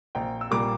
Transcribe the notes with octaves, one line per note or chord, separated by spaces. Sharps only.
A#1 G5 A#5
E6
A#2 G3 A#3 A#5 D6